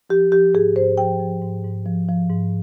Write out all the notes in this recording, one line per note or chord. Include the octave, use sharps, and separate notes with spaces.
F3 G4
F3 G4
G#2 G#4
G#2 C5
F3 G5
F3
G#2
G#2
F3
F3
G#2